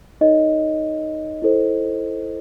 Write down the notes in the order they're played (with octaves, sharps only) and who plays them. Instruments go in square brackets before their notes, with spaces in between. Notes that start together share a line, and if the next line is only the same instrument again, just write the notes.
[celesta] D#4 A4 C#5 D#5
E4 A4 C5